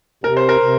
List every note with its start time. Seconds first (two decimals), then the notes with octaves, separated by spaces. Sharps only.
0.24 C3 A#4
0.37 C5
0.49 A#4
0.61 C3